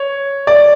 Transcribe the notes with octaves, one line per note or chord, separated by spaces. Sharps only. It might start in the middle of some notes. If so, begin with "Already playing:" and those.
Already playing: C#5
D5